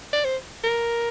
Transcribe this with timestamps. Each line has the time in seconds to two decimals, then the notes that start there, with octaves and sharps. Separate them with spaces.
0.13 D5
0.25 C5
0.64 A#4